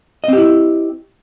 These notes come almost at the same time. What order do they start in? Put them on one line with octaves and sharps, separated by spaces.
D#5 C4 G4 E4